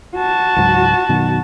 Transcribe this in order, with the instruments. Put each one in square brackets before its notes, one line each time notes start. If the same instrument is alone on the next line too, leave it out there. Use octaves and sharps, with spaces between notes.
[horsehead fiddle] F#4 A5
[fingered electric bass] C#2 G#2 F#3
F#2 B2 D#3